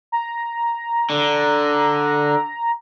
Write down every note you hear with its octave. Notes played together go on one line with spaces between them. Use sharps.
A#5
D3